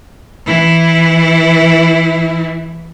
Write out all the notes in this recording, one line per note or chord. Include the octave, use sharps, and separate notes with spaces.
E3 E4